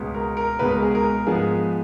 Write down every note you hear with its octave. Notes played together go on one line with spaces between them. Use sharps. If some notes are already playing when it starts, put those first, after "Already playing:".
Already playing: C#2 B2 G#3 B3
A#4
A#4
C#2 B2 G#3 B3 B4
A#4
G#4
A#4
G#2 F3 G#3 B3 G#4